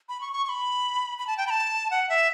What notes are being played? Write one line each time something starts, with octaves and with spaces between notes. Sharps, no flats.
B5
C#6
C#6
C#6
B5
B5
A5
G5
B5
A5
F#5
E5